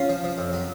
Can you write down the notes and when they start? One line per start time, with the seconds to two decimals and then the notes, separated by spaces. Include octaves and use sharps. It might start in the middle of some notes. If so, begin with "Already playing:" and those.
Already playing: C#4 F4
0.09 F3
0.24 F3
0.38 F2
0.53 F#3